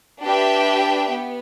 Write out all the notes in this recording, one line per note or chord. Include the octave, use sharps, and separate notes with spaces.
D4 G4 B4 E5 G5
B3